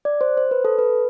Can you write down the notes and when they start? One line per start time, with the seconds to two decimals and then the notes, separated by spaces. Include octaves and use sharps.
0.05 D5
0.21 C5
0.37 C5
0.51 B4
0.65 A4
0.79 B4